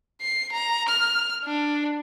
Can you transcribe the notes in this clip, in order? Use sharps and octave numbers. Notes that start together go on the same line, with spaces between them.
C7
A#5
F6
D4